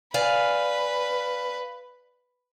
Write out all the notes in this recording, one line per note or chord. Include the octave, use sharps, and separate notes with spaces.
B4 D5 F5 G#5